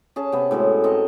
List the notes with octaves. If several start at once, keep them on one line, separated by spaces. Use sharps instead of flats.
C#4 G#4 A5
C3 B3
A2 G#3 C#4 F#4
C4 A4 A#4 D#5